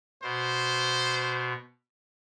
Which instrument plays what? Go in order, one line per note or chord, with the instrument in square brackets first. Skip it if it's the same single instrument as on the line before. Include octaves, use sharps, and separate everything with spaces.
[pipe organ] B2 [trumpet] C5